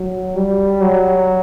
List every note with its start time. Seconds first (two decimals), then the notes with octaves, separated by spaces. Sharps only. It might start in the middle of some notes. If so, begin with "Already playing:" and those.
Already playing: F#3
0.36 G3
0.81 F#3